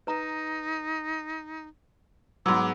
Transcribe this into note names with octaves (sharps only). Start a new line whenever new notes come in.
D#4 B4 A#5
G#2 F#3 G#3 B3 D6 E6